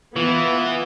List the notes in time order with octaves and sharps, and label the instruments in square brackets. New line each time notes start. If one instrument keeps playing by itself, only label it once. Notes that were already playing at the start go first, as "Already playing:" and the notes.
[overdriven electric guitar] E3 [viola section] B3 [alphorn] F4